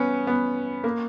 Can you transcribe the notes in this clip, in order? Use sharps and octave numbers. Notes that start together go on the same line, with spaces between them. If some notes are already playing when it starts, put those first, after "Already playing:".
Already playing: B3 C#4
B3
A#3